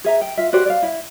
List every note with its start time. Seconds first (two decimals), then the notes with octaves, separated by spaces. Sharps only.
0.04 G#4 E5 A#5
0.21 G5
0.37 F4 E5
0.53 F#4 G4 C5 D5
0.66 D5 F5
0.83 E4